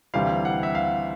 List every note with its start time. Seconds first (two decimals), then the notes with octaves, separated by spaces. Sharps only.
0.14 D2 C3 E3 G3 F5
0.45 F#5
0.63 E5
0.75 F5